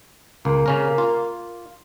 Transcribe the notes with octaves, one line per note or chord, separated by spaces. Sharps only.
C#2 A#3
C#3 C#4 A#4
F4